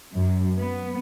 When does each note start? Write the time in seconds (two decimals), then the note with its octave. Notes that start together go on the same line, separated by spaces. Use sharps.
0.15 F#2
0.57 B3